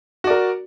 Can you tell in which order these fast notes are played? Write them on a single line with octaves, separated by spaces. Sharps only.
F#4 D5 A#4